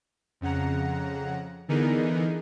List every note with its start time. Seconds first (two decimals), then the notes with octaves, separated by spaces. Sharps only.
0.41 F2 C#3 F#5 A#5
1.68 D3 E3 B3 D#4 G#4 A#4